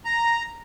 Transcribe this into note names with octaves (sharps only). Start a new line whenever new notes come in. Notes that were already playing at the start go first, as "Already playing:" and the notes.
A#5